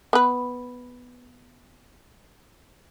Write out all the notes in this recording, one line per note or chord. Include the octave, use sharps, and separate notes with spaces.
B3 B4